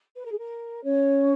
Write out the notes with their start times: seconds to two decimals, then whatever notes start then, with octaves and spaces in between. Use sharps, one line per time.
0.15 B4
0.24 A#4
0.31 G#4
0.39 A#4
0.83 C#4 C#5